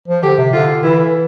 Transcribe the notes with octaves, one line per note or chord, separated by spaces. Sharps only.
F3
D3 G4
C3
D3 F4
E3 E4